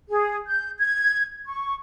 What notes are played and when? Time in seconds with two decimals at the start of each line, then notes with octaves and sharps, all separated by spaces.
0.09 G#4
0.47 G6
0.78 G#6
1.46 C#6